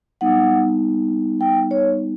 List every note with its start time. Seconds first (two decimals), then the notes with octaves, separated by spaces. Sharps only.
0.21 G3 B3 D#4 F#5
1.41 G5
1.71 C#5